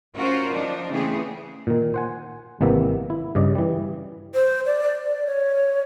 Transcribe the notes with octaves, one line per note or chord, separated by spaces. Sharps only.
C#4 F4 F#4 A#4 C5
F3 D4 D#4
C#3 E3 A3 B3 C4 G#4
A#2 D#3
C5 F#5 G#5
G#1 C3 E3 A#3 B3 E5
E4
G2 C#3 D5 D#5
E3 G3
C5
D5
D5
C#5